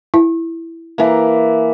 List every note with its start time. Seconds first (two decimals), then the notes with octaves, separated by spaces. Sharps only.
0.14 E4
0.98 E3 A#3